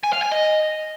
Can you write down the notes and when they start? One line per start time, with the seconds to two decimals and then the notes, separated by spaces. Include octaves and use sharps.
0.04 G#5
0.13 F5
0.23 G#5
0.32 D#5